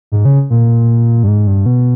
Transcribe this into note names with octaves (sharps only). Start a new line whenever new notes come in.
G#2
C#3
A#2
G2
G#2
G2
B2